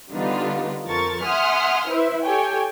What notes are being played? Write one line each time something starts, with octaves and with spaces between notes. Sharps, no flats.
D3 G3 B3 D#4 F4 B4
F2 F3 A4 A#4 C#6 A6
E5 F#5 G#5 C6 D#6 F6
E4 B4 C5 E5
G4 A4 C#5 G5 G#5